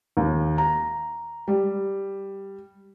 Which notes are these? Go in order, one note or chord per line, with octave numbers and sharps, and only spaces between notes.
D#2
A#5
G3